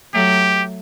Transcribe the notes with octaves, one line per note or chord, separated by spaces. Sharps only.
F#3 A3 G4